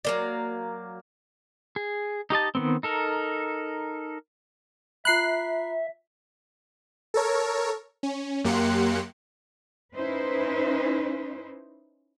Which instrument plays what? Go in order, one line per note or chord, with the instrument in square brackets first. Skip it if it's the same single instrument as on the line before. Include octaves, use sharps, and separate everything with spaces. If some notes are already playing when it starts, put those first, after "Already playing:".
[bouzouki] F#3 A#3 D5
[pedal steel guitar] G#4
D#4 G4 D#5 A5
D#3 B3 C4
D#4 A4 A#4
[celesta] F4 A#5 B5 [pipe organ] E5 [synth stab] F#6 C7
[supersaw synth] A4 A#4 C#5
C#4
F#2 A#3 G4 C6 F#6 C#7
[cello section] C#4 D#4 E4 B4 C5